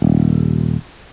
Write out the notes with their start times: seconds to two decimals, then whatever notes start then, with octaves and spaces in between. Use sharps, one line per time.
0.02 D#1